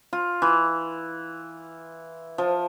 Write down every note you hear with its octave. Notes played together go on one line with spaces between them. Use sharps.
F4
E3
F3